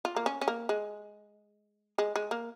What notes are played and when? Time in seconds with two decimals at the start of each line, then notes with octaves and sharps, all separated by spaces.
0.05 F4
0.16 A#3
0.26 C#4
0.41 C#4
0.48 A#3
0.69 G#3
1.98 G#3
2.16 G#3
2.31 A#3